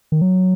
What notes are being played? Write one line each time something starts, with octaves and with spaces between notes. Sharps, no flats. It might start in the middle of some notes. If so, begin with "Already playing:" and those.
D#3
F#3